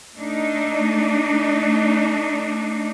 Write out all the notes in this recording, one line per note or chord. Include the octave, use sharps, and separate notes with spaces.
A3 D4 D#4